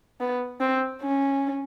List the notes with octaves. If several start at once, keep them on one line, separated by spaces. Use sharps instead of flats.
B3
C4
C#4